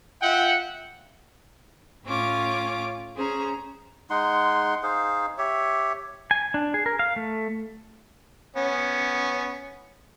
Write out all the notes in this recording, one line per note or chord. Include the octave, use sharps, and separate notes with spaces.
F4 E5 F#5 G5
A2 C#4 F4 D6
C#4 G#4 C5 A#5
G#3 D#4 F#5 C6
D#4 G#4 C5 F5
G4 C#5 E5
G#5
D4
G#4
A#4
F5
A3
B3 C#4